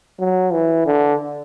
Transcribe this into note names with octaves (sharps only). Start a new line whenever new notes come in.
F#3
E3
D3